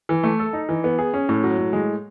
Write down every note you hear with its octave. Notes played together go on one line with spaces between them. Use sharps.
E3
A3
A4
D#4
E3
B3
G#4
C#4
A2
F#3
A2
G#3